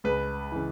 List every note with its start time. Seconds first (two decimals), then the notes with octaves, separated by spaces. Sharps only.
0.04 C#2 B4
0.52 C#3 E3